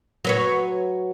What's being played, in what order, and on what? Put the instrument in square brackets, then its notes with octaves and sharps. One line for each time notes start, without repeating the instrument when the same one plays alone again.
[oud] F#3 B4 C#5